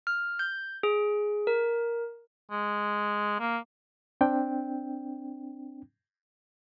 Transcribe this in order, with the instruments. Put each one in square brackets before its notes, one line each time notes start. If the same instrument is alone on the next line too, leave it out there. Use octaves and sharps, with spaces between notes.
[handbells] F6
G6
G#4
A#4
[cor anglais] G#3
A#3
[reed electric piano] C4 D4 G5